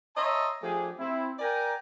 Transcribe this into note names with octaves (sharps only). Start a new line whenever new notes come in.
C#5 D#5 E5 A5 A#5 C6
F3 A3 D4 G4 G#4
C4 E4
A#4 D5 G5 G#5 A#5